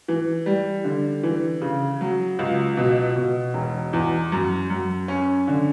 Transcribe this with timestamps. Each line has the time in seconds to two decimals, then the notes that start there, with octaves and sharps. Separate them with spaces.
0.08 E3
0.46 G3
0.84 D3
1.23 E3
1.61 C#3
2.01 F#3
2.39 C#2
2.77 B2
3.16 B2
3.54 E1
3.93 E2
4.32 F#2
4.70 F#2
5.08 C#4
5.48 D3